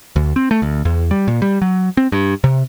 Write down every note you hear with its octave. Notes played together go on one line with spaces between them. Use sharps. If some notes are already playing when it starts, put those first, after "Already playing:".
D2
C4
A3
D2
E2
G3
A#2
G3
F#3
C4
G2
C3